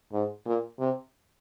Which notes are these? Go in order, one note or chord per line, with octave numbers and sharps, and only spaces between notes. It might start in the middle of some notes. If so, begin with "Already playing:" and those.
G#2
A#2
C3